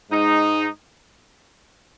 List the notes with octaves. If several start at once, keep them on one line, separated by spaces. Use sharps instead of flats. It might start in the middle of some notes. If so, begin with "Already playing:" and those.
G#2 G#3 D#4